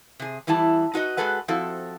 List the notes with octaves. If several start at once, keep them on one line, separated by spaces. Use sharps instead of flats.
C3 G#4
E2 E3 G3 E4 A5
D#4 F#4 B4 D#5
G#3 F#4 G#4 A4 B4 F#5
F3 C4 E4 F#4 A4